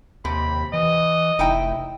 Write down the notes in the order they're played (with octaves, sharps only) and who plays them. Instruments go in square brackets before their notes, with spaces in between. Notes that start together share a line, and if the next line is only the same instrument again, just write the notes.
[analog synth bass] D#2 [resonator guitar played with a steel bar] C3 [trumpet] B5
[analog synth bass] E3 [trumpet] D#5
[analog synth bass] F1 [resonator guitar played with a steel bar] D#4 E4 G5